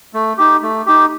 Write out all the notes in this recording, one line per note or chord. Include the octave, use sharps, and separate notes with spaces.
A3
D#4 G4
A3
D#4 G4